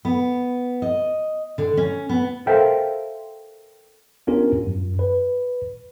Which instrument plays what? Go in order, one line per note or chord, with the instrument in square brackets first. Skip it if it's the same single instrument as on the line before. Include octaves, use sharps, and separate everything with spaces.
[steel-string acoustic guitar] B3
D#5
D3
C#4
B3
[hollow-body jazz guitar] A4 A#4 C5 E5 F5 G5
[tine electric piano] B3 C#4 D4 F4 G4 A#4
F#2
B4